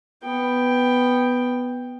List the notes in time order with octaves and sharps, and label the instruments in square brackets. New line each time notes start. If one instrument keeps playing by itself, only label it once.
[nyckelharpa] B3 G5